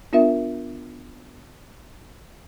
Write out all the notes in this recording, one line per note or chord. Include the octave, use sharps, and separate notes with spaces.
B3 D4 F4 A#4 E5